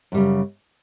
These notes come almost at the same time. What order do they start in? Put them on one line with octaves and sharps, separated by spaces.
F#2 G3 C#3